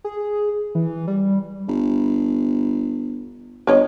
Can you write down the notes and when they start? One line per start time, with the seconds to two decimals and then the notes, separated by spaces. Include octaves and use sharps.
0.04 G#4
0.75 E3
1.08 G3
1.68 G1
3.67 G1 A#4 C#5 D#5